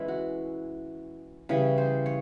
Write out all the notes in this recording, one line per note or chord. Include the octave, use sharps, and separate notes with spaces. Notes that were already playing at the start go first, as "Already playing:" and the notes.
Already playing: E3 G#3 C#4 E4
F#4
C#3 E3 G3
C5
C#5